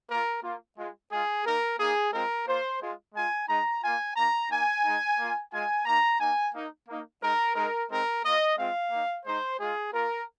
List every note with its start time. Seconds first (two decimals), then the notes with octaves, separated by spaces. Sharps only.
0.08 A#3 F4 A#4
0.43 A#3 F4
0.77 G#3 F4
1.11 G#3 F4 G#4
1.44 A#3 D#4 A#4
1.79 A#3 D#4 G#4
2.12 G#3 C4 F4 A#4
2.47 A#3 F4 C5
2.81 G#3 F4
3.14 G#3 F4 G#5
3.48 G#3 D#4 A#5
3.83 A#3 F4 G#5
4.16 A#3 D#4 A#5
4.50 A#3 D#4 G#5
4.83 G#3 D#4
5.18 A#3 F4
5.52 G#3 F4 G#5
5.86 A#3 D#4 A#5
6.19 A#3 D#4 G#5
6.53 A#3 D#4
6.88 A#3 D#4
7.21 G#3 D#4 A#4
7.55 G#3 D#4 A#4
7.89 G#3 C4 D#4 A#4
8.23 A#3 F4 D#5
8.57 G#3 C4 F4 F5
8.91 A#3 D#4
9.25 G#3 D#4 C5
9.59 G#3 F4 G#4
9.93 A#3 F4 A#4